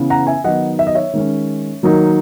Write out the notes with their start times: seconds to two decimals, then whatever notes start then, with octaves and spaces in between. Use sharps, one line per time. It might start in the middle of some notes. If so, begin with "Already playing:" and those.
Already playing: C#3 E3 B3
0.10 F#5 A#5
0.27 E5 G#5
0.44 D#3 F#3 B3 D#4 D#5 F#5
0.79 E5
0.87 D#5
0.95 C#5 E5
1.13 D#3 G#3 C#4
1.83 D#3 F#3 A#3 D#4